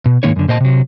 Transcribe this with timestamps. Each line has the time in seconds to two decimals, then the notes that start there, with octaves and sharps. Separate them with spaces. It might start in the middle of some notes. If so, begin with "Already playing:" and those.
0.06 B2
0.23 G#2 C3 D#3 A#3 D#4 C#5
0.36 F#2 D3
0.48 A#2 C5 D#5 A5
0.60 C3 F#3